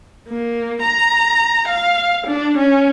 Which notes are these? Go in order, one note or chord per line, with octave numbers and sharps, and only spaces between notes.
A#3
A#5
F5
D4
C#4